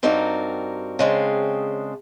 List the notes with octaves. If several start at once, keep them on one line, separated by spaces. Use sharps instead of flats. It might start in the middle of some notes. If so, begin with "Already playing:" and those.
G2 C4 D#4 F#4 A#4 D5
C#3 G#3 C4 D4